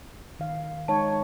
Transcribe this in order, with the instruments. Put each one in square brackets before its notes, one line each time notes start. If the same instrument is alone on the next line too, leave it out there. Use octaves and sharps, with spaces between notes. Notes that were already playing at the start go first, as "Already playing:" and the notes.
[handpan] D#3 F5
[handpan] G#3 D#4 C#5 [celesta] A5